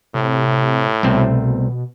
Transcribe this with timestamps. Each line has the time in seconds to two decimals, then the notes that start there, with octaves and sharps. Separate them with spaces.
0.15 A2 C3
1.03 C2 B2 A3 C4